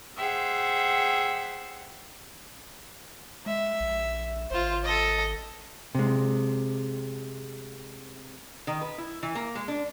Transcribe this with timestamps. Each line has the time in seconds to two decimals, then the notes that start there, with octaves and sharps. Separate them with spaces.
0.17 G#4 C5 E5 F#5 G5
3.46 G#3 E5
3.80 A#1
4.51 G#1 F4 C5
4.85 A4 D#5
5.95 C3 G#3
8.67 D#3
8.81 B4
8.98 E4
9.23 E3
9.35 A#3
9.55 G#3
9.68 D4